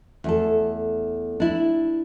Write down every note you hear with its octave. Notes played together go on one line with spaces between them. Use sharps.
E2 A3 A4
D4 E4